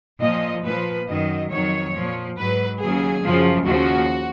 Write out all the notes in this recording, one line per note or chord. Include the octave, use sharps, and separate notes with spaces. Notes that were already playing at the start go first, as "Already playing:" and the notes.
A#2 F3 D#5
A#2 F3 B4
F#2 D#3 F#3 D#5
F2 D#3 F#3 C#5
A#2 F3
G#2 F#3 B4
D#2 C#3 F#3 G#4
F#2 C#3 F3
D#2 C#3 F3 F#4